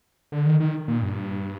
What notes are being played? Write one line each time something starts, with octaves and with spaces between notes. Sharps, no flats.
D3
D#3
D#3
A#2
G2